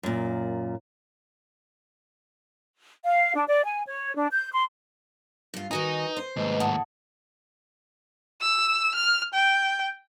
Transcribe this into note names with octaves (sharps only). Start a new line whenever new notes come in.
F#2 A#2
F5
D4
D5
G#5
C#5
D4
G6
C6
G2 F4
D#3 D#4 F#4 B4 G#5
C5
D#2 G#2 A3 B4 D#5
A2 F#5 A5 D#6
E6
F6
G5